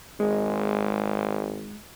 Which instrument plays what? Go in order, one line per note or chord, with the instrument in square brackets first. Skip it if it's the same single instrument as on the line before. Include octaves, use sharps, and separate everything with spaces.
[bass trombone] G#1 [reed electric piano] G#3